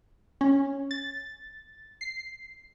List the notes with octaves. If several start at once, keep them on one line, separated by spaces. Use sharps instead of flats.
C#4
A6
C7